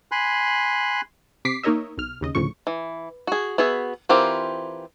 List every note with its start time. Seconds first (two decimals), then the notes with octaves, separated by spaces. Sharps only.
0.11 G#5 B5 C6 F#6
1.45 C3 D6 B6 C7
1.63 A#3 D#4 A#4 C#5 D#5 E5
1.97 B1 F6
2.21 D#2 C#3 D#5
2.35 G#1 D2 A2 C#3 F3 C#6
2.67 E3
3.27 F#4 G#4
3.58 B3 F#4 G#4 E5
4.09 E3 C4 F4 G4 A#4